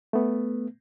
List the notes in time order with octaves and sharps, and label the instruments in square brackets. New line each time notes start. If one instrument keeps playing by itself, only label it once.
[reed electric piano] A3 B3